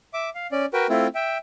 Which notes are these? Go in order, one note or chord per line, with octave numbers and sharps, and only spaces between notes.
E5 D6
F5
C#4 D5
F#4 A#4 B4 G5
A3 C4 E4 F4
E5 G5